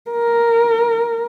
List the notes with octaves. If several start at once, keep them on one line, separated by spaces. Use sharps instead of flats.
A#4